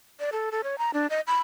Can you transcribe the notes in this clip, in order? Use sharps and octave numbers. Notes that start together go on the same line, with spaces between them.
D5
A4
A4
C#5
A#5
D4
D#5
B5